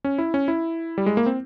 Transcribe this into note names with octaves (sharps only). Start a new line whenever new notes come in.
C#4
E4
C#4
E4
G3
G#3
A#3
C4